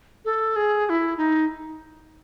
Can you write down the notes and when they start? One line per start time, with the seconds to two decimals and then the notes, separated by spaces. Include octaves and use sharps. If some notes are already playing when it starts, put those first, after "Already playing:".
0.25 A4
0.56 G#4
0.86 G#4
0.89 E4
1.17 D#4